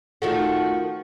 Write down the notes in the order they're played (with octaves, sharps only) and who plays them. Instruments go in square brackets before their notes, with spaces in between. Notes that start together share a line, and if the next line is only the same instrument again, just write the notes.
[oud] D#3 F3 A3 [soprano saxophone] F#4